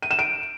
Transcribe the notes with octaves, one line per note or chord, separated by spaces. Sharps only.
D#7
E7
D7